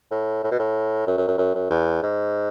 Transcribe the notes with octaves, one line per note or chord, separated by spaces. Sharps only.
A2
A2
B2
A2
F#2
F#2
F#2
F#2
F#2
E2
G#2